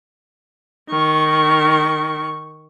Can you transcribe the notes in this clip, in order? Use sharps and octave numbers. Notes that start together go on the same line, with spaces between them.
D#3 C#6